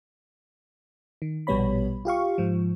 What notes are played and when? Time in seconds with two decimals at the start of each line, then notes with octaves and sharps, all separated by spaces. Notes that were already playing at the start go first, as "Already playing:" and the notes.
1.22 D#3
1.47 A#1 B2 G3 B3 C#5 B5
2.05 F4 G4 F5 C#6
2.38 G#2 F3